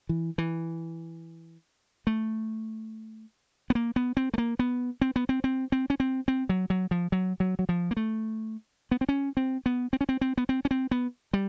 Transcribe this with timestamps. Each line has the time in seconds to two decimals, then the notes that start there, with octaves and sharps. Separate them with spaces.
0.09 E3
0.38 E3
2.07 A3
3.70 B3
3.75 A#3
3.96 B3
4.17 C4
4.34 A3
4.38 A#3
4.59 B3
5.02 C4
5.16 B3
5.29 C4
5.44 C4
5.72 C4
5.90 C#4
6.00 C4
6.28 C4
6.49 F#3
6.70 F#3
6.91 F3
7.12 F#3
7.40 F#3
7.59 F#3
7.69 F3
7.91 A#3
7.97 A3
8.91 B3
9.01 C4
9.09 C#4
9.37 C4
9.66 B3
9.93 C4
10.01 C#4
10.09 C4
10.21 C4
10.38 B3
10.49 C4
10.65 C#4
10.71 C4
10.91 B3
11.33 G3